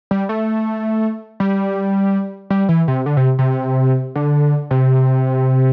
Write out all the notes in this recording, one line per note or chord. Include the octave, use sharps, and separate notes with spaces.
G3
A3
G3
G3
E3
C3
D3
C3
C3
D3
C3